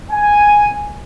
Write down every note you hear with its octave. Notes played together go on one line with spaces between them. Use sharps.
G#5